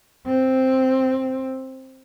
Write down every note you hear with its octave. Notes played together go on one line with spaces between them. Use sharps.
C4